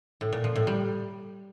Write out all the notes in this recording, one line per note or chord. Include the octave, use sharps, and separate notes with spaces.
A2
A#2
F3
A2
G3